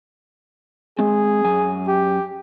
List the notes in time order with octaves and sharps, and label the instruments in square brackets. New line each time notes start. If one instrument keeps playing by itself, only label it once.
[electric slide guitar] G#3 C4 [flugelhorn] G#4
[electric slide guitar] F#2 G#5
[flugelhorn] G4